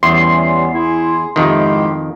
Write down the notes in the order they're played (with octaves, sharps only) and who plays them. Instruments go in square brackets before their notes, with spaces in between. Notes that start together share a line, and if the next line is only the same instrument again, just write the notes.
[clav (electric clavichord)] E2 [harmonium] E3 G3 C#4 [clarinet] B3 [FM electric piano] C6
[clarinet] E4 [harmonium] G#4
[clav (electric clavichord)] F2 D#3 [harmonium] G#2 E4 G4 [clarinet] C6